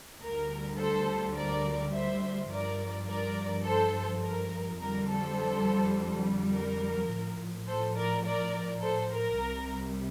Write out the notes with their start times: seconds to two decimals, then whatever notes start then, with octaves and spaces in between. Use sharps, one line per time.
0.20 D2 D3 G3 A#4
0.78 A4 C5
1.35 A#4 D5
1.92 C5 E5
2.50 G2 F3 A#4 D5
3.07 A#4 D5
3.65 A4 C5
4.23 A#4
4.80 F2 D3 G3 A#4
5.08 A4 C5
6.52 A#4
7.10 A2 F3
7.67 A4 C5
7.96 A#4 D5
8.24 A#4 D5
8.81 A4 C5
9.11 A#4
9.39 C2 C3 G3